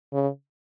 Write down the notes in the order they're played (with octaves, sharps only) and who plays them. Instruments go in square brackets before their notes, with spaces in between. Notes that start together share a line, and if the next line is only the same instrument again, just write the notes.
[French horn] C#3